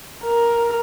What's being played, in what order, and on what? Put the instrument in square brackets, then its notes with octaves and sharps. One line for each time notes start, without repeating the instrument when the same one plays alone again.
[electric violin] A#4